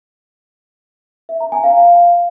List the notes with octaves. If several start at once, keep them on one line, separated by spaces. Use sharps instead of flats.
E5
A#5
G#5
F5